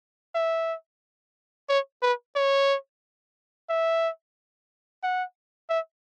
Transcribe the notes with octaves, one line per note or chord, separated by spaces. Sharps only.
E5
C#5
B4
C#5
E5
F#5
E5